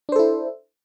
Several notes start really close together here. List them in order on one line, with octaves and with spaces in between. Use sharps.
D4 C5 A4 E4